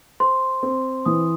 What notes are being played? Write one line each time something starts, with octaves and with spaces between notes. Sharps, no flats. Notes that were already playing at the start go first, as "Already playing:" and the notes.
C5 C6
C4
E3 D#6